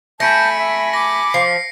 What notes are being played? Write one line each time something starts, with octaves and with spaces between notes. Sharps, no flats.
A3 G#5 A5 B5 G6 A#6 C#7 D7
E5
D6 A#6
F3 C7